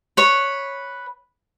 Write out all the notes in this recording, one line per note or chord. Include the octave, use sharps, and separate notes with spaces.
B4 C#5